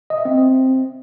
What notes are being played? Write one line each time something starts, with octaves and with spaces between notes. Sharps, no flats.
D#5
E5
C4